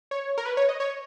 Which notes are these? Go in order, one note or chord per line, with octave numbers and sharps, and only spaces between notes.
C#5
A#4
B4
C#5
D#5
C#5